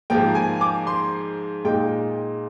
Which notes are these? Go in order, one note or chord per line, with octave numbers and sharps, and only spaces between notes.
G#2 F3 A#3 G5
G#5
D6
C6
A#2 G#3 D#4 G5